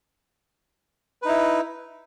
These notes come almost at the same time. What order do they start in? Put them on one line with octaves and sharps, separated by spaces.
B4 D#4 E4